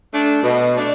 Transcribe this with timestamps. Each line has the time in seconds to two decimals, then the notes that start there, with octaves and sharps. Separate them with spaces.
0.11 A3 D4
0.43 B2
0.76 A3 D4